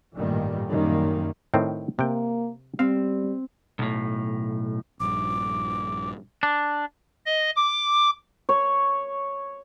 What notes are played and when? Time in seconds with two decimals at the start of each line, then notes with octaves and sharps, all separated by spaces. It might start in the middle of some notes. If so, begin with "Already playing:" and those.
0.14 A1 G2 A#2 D#3 G3
0.68 F#2 D#3 G3 A#3
1.54 A2 D#3 C4
1.99 C3 A#3 G5
2.79 G3 C4 F5
3.79 B1 A2
5.00 A#1 G2 D6
6.43 D4
7.26 D#5
7.56 D6
8.49 C#5